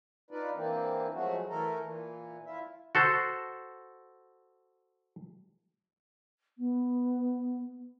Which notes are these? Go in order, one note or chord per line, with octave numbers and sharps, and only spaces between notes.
D4 D#4 F4 B4 D5
E3 A#3 C4 D4
F3 F#3 G#3 A3 F#4
E3 A3 A4 A#4
A#2 E3
E4 F4 E5
F#4 A4 C5
B3